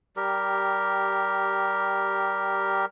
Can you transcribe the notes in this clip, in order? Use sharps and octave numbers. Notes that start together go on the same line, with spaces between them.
G3 G4 A#4